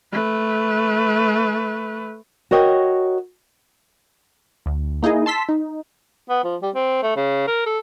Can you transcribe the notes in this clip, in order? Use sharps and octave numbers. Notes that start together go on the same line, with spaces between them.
A3 B4
F#4 A#4 C#5 D#5 G5
D2
A#3 D#4 E4 G#4 D#5
A5 C6 E6 B6
D#4
B3
F3
G3
C4
A3
C#3
A#4
A4